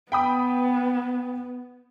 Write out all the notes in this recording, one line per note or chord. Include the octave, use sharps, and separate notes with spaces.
B3 G5 B5 D#6